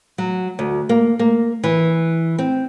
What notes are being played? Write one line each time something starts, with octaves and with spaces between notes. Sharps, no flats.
F#3
D2
A#3
A#3
E3
C4